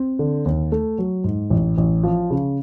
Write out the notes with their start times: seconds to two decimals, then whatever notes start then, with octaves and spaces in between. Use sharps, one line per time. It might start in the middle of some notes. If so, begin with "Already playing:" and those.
Already playing: C4
0.19 D3
0.45 D#2
0.72 A3
0.98 F#3
1.24 G#2
1.50 A1
1.78 A1
2.03 F3
2.30 C#3